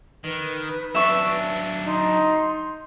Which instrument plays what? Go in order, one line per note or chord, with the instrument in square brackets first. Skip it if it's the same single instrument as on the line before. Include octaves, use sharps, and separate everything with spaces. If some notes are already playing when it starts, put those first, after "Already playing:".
[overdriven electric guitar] D#3 [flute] B4
[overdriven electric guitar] F#3 D4 [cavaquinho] E5 C#6
[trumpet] D#4 [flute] C6